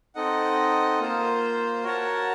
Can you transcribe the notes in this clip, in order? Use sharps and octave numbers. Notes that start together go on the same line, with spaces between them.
C4 D#4 A4 D#5 F#5
A#3 F4 C5
F#4 A#4 C#5 F#5 A5